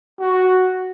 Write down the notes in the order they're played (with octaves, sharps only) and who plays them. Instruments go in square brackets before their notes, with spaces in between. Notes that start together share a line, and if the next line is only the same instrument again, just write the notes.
[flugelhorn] F#4